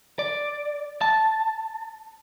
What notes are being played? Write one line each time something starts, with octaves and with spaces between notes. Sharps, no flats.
D5
A5